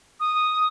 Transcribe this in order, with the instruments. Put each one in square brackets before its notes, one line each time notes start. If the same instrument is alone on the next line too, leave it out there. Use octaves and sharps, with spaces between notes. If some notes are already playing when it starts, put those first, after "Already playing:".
[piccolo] D#6